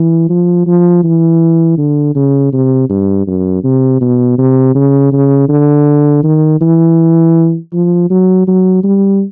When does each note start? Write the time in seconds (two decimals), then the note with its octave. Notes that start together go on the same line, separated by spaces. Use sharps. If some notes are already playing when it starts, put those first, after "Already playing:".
Already playing: E3
0.29 F3
0.67 F3
1.04 E3
1.78 D3
2.15 C#3
2.53 C3
2.90 G2
3.27 F#2
3.64 C3
4.01 B2
4.38 C3
4.75 C#3
5.13 C#3
5.49 D3
6.24 D#3
6.61 E3
7.74 F3
8.10 F#3
8.48 F#3
8.84 G3